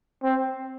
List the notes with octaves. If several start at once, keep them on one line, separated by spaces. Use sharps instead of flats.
C4